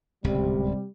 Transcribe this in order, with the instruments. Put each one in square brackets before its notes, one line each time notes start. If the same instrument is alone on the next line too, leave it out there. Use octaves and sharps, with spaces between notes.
[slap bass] D1 C#2 [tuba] C3 [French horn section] G3